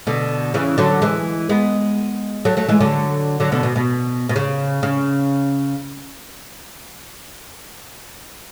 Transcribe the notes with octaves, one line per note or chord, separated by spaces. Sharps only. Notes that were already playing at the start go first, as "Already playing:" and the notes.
B2 D3
C#3 E3
D3 F#3
E3 G#3
G#3 B3
F#3 A3
F#3 A3
E3 G#3
D3 F#3
D3 F#3
B2 D3
B2
B2
B2
C#3
C#3